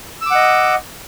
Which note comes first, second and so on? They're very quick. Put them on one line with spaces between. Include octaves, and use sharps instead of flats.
E6 D6 F#5 D#5